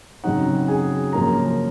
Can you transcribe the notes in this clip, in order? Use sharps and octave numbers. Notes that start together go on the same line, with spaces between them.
F#2 C#3 F#3 C4 D#4 F#4 F#5
G#4 G#5
F#2 C#3 F3 A#3 C#4 A#4 A#5